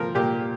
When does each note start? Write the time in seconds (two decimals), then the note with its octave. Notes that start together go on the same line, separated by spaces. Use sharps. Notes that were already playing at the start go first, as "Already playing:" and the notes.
Already playing: F3 A#4
0.15 A#2 G4